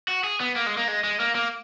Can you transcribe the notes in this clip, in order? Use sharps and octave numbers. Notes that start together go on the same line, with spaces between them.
F#4
G#4
B3
A#3
G#3
A#3
G#3
G#3
A#3
A#3